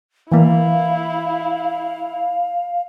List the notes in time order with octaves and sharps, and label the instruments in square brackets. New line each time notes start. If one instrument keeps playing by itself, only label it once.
[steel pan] E3 A#3 [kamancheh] E4 [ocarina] F5